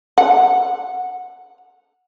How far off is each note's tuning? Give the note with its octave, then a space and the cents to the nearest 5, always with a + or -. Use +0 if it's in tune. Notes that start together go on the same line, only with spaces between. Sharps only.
F#5 -15